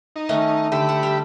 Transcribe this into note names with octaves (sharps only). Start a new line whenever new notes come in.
D#4
D#3 A3 C#4
D3 G4 E5 B5
F#5
G3